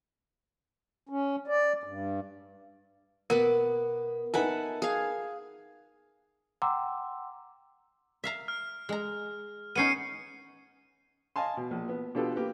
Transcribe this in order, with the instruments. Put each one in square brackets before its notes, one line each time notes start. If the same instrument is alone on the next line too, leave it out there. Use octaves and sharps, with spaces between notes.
[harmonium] C#4
D5
G2
[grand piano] B2 [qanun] B3 B4 D6 [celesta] A#4
[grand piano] D#4 B4 G#5 [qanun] A4 E5 F#5
[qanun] G#4 F5
[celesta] F#5 G5 A#5 C6 D6 E6
[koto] E5 F5 A#5
[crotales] F6
[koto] G#3 A#5
[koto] B3 C#4 D#4 [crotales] C7 C#7 D#7
[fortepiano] D#5 F5 G#5 A5 C6
B2
A#1
B3
B2 D4 F4 G4 A4 B4
A#3 G4 B4